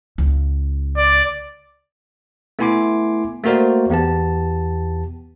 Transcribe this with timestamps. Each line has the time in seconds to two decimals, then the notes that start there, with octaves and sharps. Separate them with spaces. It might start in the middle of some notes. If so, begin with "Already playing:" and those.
0.18 C#2
0.97 D5
2.59 A3 B3 E4 G#5 C6 D6
3.44 A3 A#3 F#4 A#4 C5 D5
3.90 E2 B3 G4 A5